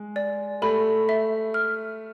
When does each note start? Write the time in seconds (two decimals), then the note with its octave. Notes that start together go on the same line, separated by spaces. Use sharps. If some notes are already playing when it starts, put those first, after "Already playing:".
Already playing: G#3
0.16 D5
0.62 A3 B5
1.09 E5
1.54 F6